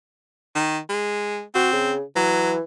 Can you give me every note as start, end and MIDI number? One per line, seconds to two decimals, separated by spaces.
0.55 0.78 51
0.89 1.42 56
1.55 1.93 60
1.55 1.70 66
1.73 2.01 49
2.16 2.62 52
2.16 2.53 54